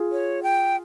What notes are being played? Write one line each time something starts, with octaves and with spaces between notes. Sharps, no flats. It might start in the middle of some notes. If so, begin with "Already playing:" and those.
Already playing: F4 G#4
C#5
G5